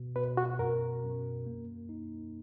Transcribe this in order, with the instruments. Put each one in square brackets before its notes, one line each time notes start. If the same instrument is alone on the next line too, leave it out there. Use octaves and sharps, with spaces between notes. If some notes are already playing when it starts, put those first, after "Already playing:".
Already playing: [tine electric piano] B2
[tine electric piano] B2 [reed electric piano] B4
[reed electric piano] F#4
[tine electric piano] F#2 [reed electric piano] A#4
[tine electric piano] F#2
A#3
D#4